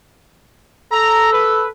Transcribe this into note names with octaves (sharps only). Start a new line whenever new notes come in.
A4 A#5
B4